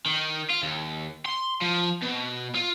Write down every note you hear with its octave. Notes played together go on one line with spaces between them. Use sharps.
D#3
F4
D#2
C6
F3
B2
F4